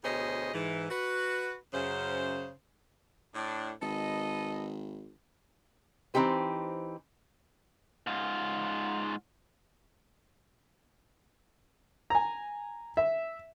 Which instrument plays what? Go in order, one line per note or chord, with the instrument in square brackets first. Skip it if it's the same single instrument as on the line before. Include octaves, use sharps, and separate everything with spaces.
[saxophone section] D2 B2 G#4 C5 C#5 D#5
G#2 E3
F#4 B4
F#2 C#3 C5
[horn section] A2 D4
[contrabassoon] G#1 [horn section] A4 B4 D#5
[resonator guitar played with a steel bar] E3 C4 D#4 G4 C5
[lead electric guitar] G#2 F4
[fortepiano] G#5 A#5
E5